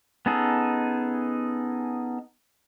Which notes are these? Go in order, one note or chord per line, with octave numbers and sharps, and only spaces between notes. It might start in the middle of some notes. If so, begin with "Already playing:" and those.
B3 C#4 D#4 G#4 A4